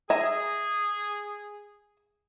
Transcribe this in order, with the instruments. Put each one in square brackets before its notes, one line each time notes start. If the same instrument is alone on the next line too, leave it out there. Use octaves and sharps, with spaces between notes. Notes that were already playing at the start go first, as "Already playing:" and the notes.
[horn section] G#4 [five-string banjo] E5 G#5 A#5